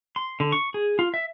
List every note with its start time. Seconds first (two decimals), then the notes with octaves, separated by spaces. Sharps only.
0.16 C6
0.40 D3
0.52 C#6
0.74 G#4
0.99 F4
1.14 E5